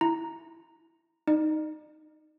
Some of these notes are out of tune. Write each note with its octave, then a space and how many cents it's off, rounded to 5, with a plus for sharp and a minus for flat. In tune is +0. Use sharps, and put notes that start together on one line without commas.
E4 +0 A#5 +0
D#4 +0 D5 +45